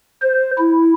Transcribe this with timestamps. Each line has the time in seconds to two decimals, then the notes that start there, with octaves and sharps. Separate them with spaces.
0.22 C5
0.58 E4